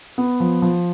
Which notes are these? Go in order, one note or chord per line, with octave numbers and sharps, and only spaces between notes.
B3
F3
F3